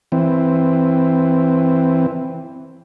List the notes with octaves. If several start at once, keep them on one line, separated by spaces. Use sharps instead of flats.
E3 C4